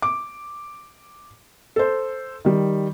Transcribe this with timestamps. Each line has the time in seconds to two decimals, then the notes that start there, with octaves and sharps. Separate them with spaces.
0.02 D6
1.76 A4 C5
2.45 D#3 G3